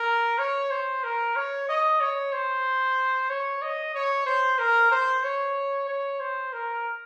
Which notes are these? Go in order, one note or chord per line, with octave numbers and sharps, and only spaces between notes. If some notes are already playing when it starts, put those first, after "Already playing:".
Already playing: A#4
C#5
C5
A#4
C#5
D#5
C#5
C5
C#5
D#5
C#5
C5
A#4
C5
C#5
C#5
C5
A#4